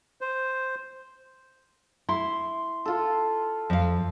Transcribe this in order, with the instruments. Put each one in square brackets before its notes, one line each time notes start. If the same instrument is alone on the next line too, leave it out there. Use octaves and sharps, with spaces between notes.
[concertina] C5
[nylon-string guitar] E4 [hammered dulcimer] C6
[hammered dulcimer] F4 A4
[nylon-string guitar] F2 F5